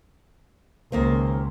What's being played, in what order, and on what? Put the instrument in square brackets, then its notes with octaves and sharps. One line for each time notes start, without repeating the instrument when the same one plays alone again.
[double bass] C#2 [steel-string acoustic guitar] D#3 A#3 C5